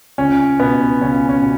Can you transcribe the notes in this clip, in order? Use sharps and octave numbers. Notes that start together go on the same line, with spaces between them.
C#2 C#4
B2 B3
C#2 C#4
C#4
B2